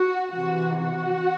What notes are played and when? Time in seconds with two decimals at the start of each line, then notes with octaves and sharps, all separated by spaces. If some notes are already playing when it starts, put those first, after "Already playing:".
Already playing: F#4
0.31 C3 E3 F#4
0.80 F#4